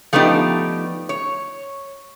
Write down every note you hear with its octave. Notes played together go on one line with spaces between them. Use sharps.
F3 A3 B3 D4 D#4 G4
C#5